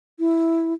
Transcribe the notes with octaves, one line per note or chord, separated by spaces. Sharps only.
E4